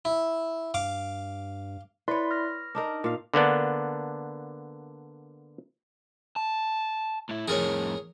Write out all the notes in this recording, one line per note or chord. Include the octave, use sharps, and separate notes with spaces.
E4
G2 F5 D6
E4 B4 C#5 D5 C6
F6 A#6
D4 D#4 A#4
A#2 F5
D3 A#3 B3 D4
A5
A2 E4
F2 A2 G#4 A#4 C#5